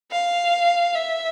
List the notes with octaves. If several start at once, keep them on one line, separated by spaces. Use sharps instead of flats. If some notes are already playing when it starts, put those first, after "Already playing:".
F5
E5